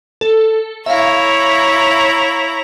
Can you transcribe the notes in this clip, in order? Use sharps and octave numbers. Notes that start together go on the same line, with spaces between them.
A4
E4 C#5 E5 F5 A#5